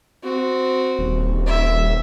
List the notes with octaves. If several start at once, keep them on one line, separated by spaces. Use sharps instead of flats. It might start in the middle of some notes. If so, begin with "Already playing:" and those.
C4 F#4
D#1
E5